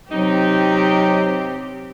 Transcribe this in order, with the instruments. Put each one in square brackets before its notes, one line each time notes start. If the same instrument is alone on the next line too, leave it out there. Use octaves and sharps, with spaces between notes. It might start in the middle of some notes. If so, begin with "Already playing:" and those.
[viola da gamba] C3 C4 G4 [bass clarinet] F#3 [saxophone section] D#4